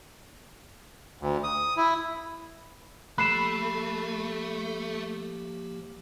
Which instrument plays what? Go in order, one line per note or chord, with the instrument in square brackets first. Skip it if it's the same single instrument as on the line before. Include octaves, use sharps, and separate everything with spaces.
[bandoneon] D2
D#6
E4
[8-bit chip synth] F3 A#3 G4 [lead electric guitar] A3 [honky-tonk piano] B5 [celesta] F#6 C7 E7